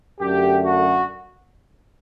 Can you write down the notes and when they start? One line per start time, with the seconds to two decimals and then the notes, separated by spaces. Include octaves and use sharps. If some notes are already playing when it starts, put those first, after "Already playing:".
0.21 F#2 D3 A3 G4
0.64 F#4